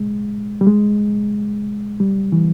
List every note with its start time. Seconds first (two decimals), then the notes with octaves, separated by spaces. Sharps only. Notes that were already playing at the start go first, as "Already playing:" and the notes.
Already playing: G#3
0.61 G3
0.66 G#3
2.00 G3
2.32 E3